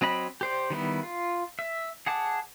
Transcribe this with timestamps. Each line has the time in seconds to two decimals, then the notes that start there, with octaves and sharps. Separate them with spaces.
0.01 F#3 C4 D#5 B5
0.41 G4 C5 D5
0.70 D#3 G3 B3 E4
1.03 F4
1.59 E5
2.06 G#4 F#5 A5 D6